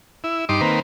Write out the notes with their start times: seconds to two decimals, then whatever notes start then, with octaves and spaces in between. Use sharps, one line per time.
0.24 E4
0.49 G2 D#4 C6 D6
0.61 D#3 A#3 C4 B4